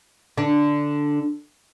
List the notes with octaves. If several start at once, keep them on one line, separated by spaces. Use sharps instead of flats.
D3 D4